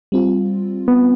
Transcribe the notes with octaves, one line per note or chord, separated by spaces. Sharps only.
G3 C4 F4
B3